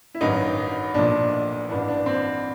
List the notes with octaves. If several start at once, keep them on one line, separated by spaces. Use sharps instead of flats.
E4
A1 G2 D#3 F#3 D#4
B1 A#2 F3 D4
A1 G2 E3 D4
D4
C4